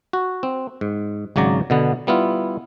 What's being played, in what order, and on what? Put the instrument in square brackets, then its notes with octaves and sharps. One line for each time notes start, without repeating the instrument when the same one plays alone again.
[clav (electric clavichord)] F#4
C4
G#2
G#1 C#3 F#3 D5 A#5
B2 D3 B3
G3 B3 E4 F4